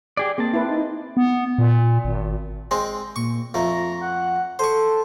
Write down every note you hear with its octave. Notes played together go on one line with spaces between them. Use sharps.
G4 G#4 D5
A#3 C4 G#4 A5
E4 B4
D#4
B3
A#2
G#1
G#3 C4
A#2 C#6
F2 A3 A#5
F#5
A4 C5 C#6